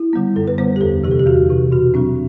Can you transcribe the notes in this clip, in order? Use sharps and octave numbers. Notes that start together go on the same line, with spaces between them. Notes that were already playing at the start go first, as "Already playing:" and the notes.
Already playing: E4
D3 G3 B3
F#2 A4
B4
D3 G3 B3 C5
G4
E2 A4
C3 E3 G4
A4
G4
E2 F#4
C3 E3
B2 F#4
F#3 C4 D4